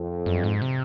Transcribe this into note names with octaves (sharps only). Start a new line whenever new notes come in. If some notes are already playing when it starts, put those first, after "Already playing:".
Already playing: F2
F#2
G#2
C3